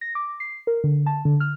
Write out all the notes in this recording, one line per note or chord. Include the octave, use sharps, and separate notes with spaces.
A#6
D6
C7
A#4
D3
A5
D3
F6